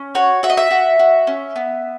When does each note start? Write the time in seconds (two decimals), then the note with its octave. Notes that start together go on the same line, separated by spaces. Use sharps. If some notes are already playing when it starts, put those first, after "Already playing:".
Already playing: C#4
0.15 F#4 C#5
0.43 F#4 E5
0.50 D#5
0.57 E5
0.71 F#4
0.99 F#4
1.27 C#4
1.56 B3